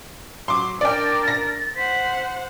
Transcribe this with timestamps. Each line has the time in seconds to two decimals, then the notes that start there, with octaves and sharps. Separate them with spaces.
0.48 F#3 C6 D6
0.81 D4 A#4 D5 G5 A6
1.28 A#6
1.75 C5 F#5 B6